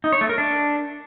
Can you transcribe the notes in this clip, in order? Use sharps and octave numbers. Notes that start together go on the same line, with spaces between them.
D#4
C#5
A3
A#4
D4